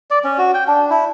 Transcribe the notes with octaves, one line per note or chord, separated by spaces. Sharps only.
D5
C#4
F#4
G5
D4
E4